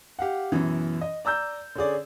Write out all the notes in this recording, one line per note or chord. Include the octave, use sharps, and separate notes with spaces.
G4 F5 F#5
F#2 B2 E3
D#5
D5 A#5 E6 G6
D3 C#4 G#4 D5